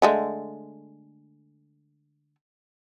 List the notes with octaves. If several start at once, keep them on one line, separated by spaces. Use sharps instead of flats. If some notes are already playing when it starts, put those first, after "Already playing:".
D3 G#3 A3